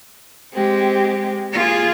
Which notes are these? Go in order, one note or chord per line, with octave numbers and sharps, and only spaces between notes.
G#3 C4 G4
A#3 F4 G#4